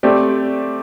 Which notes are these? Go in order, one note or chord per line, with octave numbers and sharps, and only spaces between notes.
A3 C4 G4 D5